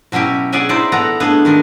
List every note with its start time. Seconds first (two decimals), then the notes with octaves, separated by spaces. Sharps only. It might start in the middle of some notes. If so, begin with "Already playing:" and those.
0.12 B2 F#3 C#4 E4 G4
0.52 G#4 D5 E5 F#5 G#5
0.69 D#4 E4 C5 D5
0.92 B3 A4 F#5 A#5
1.20 A3 B3 D4 G#4
1.45 D#3 G#3 D4